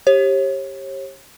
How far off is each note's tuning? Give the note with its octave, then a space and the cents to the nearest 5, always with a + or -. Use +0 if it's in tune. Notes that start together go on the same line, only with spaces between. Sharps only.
G4 +0 C#5 -35